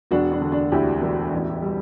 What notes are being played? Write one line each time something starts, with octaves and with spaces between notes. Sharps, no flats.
E1 D4 F#4
D4
D3
D4
D2 E4 G4
E1
A1
G3